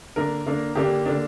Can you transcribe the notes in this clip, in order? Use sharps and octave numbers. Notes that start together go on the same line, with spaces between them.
D3 A#3 D4 A#4
D3 A#3 D4
D3 A#3 D4 G4
D3 A#3 D4